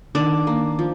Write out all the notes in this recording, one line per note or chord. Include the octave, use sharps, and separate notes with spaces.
D#3 D4 D5
A#3
F3